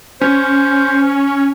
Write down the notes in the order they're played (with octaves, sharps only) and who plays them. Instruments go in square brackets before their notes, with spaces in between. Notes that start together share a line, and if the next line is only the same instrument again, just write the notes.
[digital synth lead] C#4 [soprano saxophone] C5